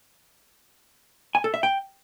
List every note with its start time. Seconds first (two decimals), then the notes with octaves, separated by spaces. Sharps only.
1.35 G#5
1.44 A4
1.54 E5
1.63 G5